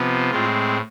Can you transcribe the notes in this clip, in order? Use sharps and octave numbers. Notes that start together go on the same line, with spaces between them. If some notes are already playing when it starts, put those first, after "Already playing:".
Already playing: C3 F3 B3
A2 G#3 C4 F4